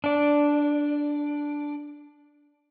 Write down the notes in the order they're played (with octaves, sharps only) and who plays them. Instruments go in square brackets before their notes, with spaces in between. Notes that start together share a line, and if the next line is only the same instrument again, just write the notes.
[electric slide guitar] D4 D5